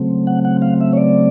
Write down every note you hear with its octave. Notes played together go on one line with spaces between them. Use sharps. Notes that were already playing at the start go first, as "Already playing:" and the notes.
Already playing: C#3 F#3 A3 C4
F#5
F#5
F5
E5
C#5
D5